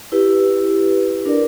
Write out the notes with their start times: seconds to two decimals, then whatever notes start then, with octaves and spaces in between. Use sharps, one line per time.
0.12 E4 G4 B4
1.25 D4 A#4 D5